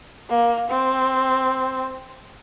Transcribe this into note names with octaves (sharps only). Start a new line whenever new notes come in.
A#3
C4